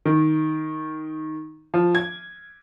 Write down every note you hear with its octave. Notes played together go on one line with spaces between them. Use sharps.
D#3
F3
G#6